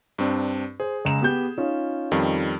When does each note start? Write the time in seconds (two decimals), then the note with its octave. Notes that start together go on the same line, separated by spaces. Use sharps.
0.19 G2 C4 D4
0.80 G#4 C5
1.05 C#2 A#5 E7
1.21 B3 G4 G6
1.58 C#4 D#4 F4
2.12 F2 D#3 G3